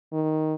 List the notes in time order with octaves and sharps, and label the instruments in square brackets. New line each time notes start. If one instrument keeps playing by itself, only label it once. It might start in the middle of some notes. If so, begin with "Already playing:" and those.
[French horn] D#3